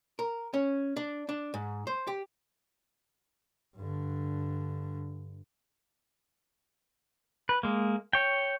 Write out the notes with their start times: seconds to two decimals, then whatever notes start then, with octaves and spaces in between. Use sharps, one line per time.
0.19 A#4
0.54 C#4
0.97 D4
1.29 D4
1.54 G#2
1.87 C5
2.07 G4
3.77 G2 D3
7.49 B4
7.63 G#3 A#3
8.13 C#5 G5